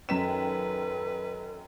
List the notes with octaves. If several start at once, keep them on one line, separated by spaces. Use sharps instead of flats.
F#2 D#3 A4 B4 G5 B6 E7